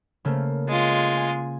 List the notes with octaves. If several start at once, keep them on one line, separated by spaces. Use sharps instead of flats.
C#3 A3 A#3
G#3 F4
G#5